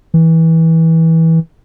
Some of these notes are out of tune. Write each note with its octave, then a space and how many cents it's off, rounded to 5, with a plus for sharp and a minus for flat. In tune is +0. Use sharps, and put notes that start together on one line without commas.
E3 -20